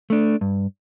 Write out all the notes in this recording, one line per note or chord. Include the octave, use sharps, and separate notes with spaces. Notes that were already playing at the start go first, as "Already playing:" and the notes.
A3 D4
G2